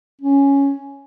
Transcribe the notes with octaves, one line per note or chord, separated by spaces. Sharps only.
C#4